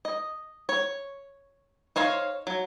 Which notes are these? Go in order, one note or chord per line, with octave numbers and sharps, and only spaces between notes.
D#5
C#5
D#4 C5 C#5 F5
F#3